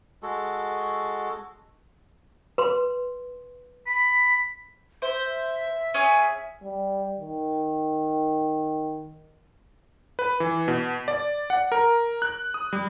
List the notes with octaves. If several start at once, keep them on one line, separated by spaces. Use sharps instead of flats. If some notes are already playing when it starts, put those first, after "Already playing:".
G#3 F#4 A4
B4 C6
B5
C5 E5
C#4 G#4
G3
D#3
B4
E3
B2
D5
F#5
A#4
F#6
D#6
G3